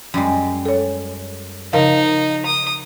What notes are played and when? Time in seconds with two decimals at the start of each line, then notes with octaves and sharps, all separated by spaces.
0.14 F#2 G3 G#3
0.65 A4 C#5
1.73 C#3 F3 D#4 A#4 F5
2.46 D#6